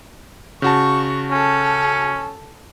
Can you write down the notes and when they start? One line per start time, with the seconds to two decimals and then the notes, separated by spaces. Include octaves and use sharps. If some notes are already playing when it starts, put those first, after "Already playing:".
0.62 C#3 F#4 A5 C#6
1.32 C#4 A4